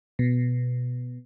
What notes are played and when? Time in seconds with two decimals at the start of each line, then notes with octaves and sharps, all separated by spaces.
0.19 B2